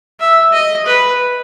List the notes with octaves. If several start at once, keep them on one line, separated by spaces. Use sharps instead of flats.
E5
D#5
B4